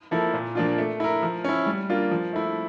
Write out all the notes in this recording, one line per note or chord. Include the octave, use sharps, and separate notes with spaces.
F3 A#3 E4 A4
A#2
F3 A#3 D4 F4
A3
E4 A#4
F3
C#4 E4
G3
A#3 D4 F4
F3
A3 E4